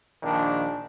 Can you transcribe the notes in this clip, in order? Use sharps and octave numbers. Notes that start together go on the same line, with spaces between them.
A#1 D#3 D4